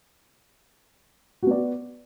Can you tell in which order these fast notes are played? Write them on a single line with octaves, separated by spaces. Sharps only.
F#4 B3 D5